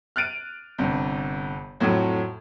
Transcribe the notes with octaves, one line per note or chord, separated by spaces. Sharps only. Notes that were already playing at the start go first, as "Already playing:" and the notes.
F6 F#6 A6 D7 D#7
G1 G2 C3
F2 A2 F#3